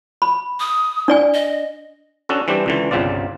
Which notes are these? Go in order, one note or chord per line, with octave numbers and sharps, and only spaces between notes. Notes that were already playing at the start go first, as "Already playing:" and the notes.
B5
D#6
D4 D5 G#5
D#5
C#4 D4 F#4 A4
E3 G3 C4 D4 G4
C#2 D3 E3
G1 C2 C#3 C4 F4 D5